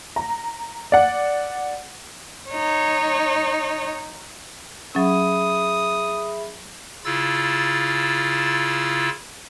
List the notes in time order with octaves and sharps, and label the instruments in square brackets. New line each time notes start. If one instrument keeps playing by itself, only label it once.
[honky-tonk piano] A#5
D5 F#5
[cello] D#4 C#5
[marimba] F#3 C#4 [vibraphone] G#4 E5 B5 [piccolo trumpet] D#6
[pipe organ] C#3 E4 F4 E6 A6